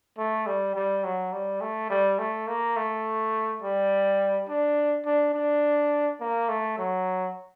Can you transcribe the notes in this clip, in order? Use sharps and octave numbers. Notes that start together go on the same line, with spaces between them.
A3
G3
G3
F#3
G3
A3
G3
A3
A#3
A3
G3
D4
D4
D4
A#3
A3
F#3